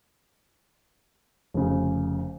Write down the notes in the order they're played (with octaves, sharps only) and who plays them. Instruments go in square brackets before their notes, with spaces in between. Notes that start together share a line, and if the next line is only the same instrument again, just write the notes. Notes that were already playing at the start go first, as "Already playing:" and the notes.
[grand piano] F1 C#3